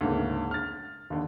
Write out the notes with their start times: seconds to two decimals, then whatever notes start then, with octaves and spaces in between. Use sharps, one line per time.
0.01 D2 G#2 C#3 A#3
0.51 F6 A6
1.10 D#2 D3